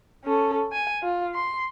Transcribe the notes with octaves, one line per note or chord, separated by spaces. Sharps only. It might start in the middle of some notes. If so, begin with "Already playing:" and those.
C#4 A4
G#5
F4
C6